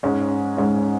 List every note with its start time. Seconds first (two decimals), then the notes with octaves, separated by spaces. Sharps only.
0.03 G#2 G#3 C#4
0.57 G#2 G#3 C#4